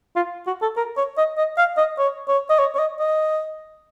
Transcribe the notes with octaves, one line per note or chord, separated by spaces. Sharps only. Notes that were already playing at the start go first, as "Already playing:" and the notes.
F4
F#4
A4
A#4
C#5
D#5
D#5
F5
D#5
C#5
C#5
D#5
C#5
C#5
D#5
D#5